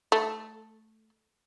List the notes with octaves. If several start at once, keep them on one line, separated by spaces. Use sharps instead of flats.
A3